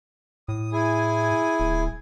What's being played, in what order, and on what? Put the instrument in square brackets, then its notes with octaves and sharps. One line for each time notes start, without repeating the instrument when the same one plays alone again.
[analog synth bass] A2 [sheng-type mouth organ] D#6
[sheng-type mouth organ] E4 G#4 G#5
[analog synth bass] D1